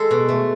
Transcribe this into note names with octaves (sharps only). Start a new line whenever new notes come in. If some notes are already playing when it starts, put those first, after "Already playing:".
Already playing: G#3 A4
B2
A3